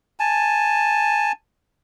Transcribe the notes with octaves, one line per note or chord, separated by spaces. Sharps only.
G#5 A5